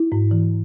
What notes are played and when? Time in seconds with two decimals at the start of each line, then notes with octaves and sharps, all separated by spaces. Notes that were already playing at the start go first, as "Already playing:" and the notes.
Already playing: E4
0.12 G#2
0.31 E3